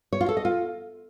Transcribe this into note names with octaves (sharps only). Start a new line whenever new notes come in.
C#5
F4
A4
D#5
F4